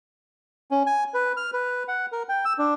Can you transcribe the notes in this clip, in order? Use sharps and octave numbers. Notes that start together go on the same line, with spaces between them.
C#4
G#5
B4
F6
B4
F#5
A#4
G5
E6
D4